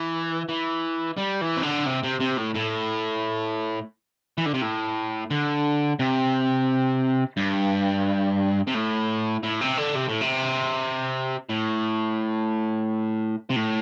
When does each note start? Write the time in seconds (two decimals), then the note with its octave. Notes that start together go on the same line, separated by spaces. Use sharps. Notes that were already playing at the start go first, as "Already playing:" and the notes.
Already playing: E3
0.49 E3
1.17 G3
1.41 E3
1.57 C3
1.63 D3
1.87 C3
2.04 C3
2.21 C3
2.38 A2
2.55 A2
4.38 E3
4.46 D3
4.54 C3
4.61 A2
5.31 D3
5.99 C3
7.37 G2
8.67 C3
8.74 A2
9.43 A2
9.61 C3
9.78 D3
9.95 C3
10.09 A2
10.22 C3
11.50 A2
13.50 C3
13.56 A2